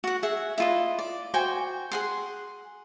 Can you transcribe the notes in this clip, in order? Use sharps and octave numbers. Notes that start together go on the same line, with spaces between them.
F#4 F#5
G#4 E5 F#5
E4 F4 D#5
D5
F#4 C5 G5 G#5
G#4 F#5 C6